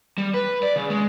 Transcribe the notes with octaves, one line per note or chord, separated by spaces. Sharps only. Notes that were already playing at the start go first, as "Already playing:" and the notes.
G3
B4
D5
C#3
G#3